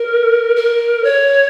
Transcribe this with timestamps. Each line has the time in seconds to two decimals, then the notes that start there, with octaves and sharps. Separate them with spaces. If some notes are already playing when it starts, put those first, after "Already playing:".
Already playing: A#4
0.56 A#4
1.04 C#5